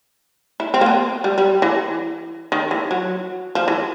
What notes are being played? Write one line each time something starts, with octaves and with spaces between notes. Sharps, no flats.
E4
C4
A#3
B3
G3
G3
E3
D#3
E3
F#3
F3
E3